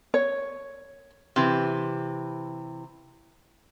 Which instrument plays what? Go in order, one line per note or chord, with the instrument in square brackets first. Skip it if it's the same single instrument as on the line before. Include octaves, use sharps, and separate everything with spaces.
[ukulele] C#5
[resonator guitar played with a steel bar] C3 E3